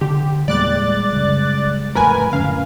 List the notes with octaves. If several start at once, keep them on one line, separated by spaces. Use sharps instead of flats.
D3 G4
E2 A#2 G3 G#3 D5 F#6 A6
C#2 F#2
D1 F2 A2 A#4 B4 G#5
F1 F#2 A2 D3 C#4 F5